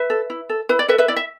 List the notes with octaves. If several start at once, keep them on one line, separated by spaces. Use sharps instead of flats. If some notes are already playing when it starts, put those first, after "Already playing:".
Already playing: B4 E5
A4
E4
A4
E4 B4
D5
A4 B4 E5
B4 E5
E4 D5
E5